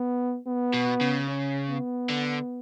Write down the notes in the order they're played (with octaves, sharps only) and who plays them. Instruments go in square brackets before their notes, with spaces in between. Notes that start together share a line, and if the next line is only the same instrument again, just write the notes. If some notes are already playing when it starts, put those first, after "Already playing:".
Already playing: [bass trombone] B3
B3
[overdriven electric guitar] B2
C#3
[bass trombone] C#4
B3
[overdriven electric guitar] D3